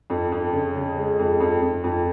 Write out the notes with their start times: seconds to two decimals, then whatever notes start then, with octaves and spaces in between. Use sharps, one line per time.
0.10 F2
0.32 F2
0.53 C#3
0.76 C#3
0.97 G#3
1.19 F2
1.40 F2
1.62 F2
1.84 F2